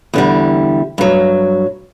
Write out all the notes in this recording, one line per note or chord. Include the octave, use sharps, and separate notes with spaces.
E2 D3 G3
G2 F#3